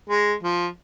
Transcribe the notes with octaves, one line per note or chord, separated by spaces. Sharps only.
G#3
F3